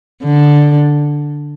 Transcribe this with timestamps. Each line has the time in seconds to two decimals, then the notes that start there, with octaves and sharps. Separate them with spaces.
0.23 D3